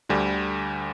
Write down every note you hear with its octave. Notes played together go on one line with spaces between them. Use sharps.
D2 D3 G3